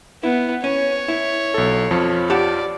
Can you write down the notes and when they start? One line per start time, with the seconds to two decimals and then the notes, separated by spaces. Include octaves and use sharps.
0.23 B3 E4
0.64 C#4 C#5
1.08 E4
1.54 B1 A4
1.91 F2 F3
2.30 G4 D5 F#5 A5